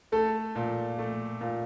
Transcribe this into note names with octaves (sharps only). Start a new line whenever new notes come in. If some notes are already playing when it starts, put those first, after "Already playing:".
A3 A4
A#2
A3
A#2